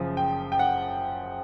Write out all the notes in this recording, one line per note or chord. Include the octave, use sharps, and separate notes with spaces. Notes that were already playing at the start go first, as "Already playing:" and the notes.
Already playing: F#1 F#2 C#3 F3
G5
G5
F#5